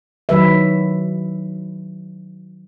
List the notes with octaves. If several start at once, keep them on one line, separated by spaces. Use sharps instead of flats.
D#3 F#3 B4 E5